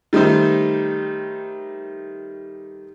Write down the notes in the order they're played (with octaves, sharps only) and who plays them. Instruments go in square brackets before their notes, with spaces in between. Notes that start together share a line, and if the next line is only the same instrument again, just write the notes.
[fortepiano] D#3 G3 A3 D#4 C5